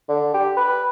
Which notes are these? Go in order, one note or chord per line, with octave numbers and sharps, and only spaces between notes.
D3
G4
B4